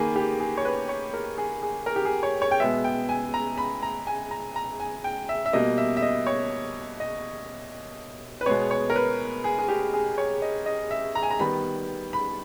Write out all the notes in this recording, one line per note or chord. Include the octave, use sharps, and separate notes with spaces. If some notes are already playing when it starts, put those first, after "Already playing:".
Already playing: D#3 A#3 G#4 B4
G4
G#4
C#5
B4
C#5
A#4
G#4
G#4
A#4
G4
G#4
C#5
C#5
G5
B2 G#3 B3 E5
G5
G#5
A#5
B5
A#5
G#5
A#5
A#5
G#5
G5
E5
E5
B2 G3 A#3 D#5
E5
E5
D#5
C#5
D#5
B4
B2 G#3 B3 C#5
C#5
A#4
B4
G#4
G#4
G4
G#4
C#5
D#5
D#5
E5
A#5
G#5
A#5
D#3 G3 B3 B5
B5